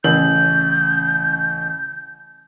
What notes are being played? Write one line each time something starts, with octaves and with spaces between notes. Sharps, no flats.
A1 C#3 G6 F#7